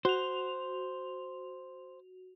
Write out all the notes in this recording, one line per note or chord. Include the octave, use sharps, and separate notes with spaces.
F#4 C5 F7